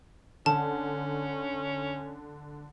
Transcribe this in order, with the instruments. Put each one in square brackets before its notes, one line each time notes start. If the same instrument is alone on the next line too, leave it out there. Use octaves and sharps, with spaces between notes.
[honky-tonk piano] D3 [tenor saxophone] C#4 [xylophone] A5